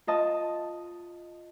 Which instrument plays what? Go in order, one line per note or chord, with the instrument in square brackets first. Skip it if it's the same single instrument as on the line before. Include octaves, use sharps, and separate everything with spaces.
[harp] F4 D#5 A5